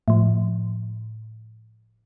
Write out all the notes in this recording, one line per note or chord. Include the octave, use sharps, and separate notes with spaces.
A2 F3